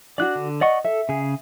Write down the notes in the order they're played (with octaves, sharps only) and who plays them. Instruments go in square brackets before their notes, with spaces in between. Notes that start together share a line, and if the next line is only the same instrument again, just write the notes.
[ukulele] D4 F4 F#4 [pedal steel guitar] D5 F#6
[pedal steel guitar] D3
[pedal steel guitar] D5 F#5 C#6 [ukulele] D#5
[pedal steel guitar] A4 [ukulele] E5
[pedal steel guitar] C#3 G#4